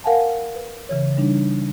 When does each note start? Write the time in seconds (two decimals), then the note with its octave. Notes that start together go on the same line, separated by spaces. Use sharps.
0.04 A#4 F5 F#5 G#5 A5
0.55 B4
0.89 C#3 E3 C#5
1.17 G3 D4 D#4